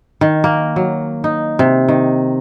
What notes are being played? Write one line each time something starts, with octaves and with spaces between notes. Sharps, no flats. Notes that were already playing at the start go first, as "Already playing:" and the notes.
D#3
A#3
F#3
D#4
C3
D#3